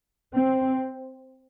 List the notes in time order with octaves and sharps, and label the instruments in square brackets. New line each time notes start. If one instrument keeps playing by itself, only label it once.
[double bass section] C4